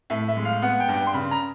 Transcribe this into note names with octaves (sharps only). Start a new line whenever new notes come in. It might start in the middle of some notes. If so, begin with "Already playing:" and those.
A2 E5
E5
G#3
F5
B3 F#5
G5
G2
G5
C6
C#3 B5
A#5